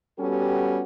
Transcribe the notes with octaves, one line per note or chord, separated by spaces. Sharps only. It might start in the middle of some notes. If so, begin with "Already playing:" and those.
G3 B3 C#4 F#4 G4 A4